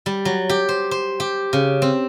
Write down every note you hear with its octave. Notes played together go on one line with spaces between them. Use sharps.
G3
F#3
G4
C5
C5
G4
C#3
C4